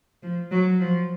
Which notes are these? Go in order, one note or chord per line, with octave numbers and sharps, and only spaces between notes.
F3
F#3
F3